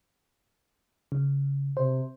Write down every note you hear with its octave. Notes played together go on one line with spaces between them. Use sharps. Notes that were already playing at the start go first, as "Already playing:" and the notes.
C#3
C3 C5